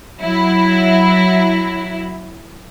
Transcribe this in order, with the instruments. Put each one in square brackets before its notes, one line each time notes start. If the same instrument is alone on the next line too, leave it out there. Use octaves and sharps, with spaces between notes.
[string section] F#3 E4